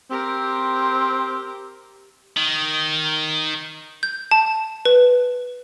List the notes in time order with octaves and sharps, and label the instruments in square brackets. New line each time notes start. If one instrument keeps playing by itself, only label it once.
[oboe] C4 [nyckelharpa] G4 A#4
[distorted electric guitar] D#3
[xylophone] G6
A5
B4